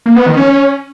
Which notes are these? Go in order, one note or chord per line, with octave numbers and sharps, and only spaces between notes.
A#3
B3
D#3
C#4